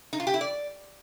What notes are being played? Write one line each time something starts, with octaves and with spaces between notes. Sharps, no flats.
D#4
F4
G4
E4
D5